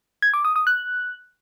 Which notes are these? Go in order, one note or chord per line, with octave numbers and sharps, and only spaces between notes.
G#6
D6
D#6
D#6
F#6